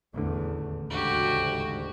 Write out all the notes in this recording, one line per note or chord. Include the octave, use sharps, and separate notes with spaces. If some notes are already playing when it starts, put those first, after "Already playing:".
D#1 A1 E2 D3 A3
D2 G#2 C#3 A3 F#4 G4